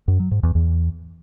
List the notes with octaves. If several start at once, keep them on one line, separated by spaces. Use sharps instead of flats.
F#2
F#3
G#2
E2
E2